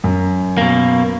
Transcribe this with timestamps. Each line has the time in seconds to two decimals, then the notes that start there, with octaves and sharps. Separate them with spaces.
0.04 F#2
0.58 B2 A#3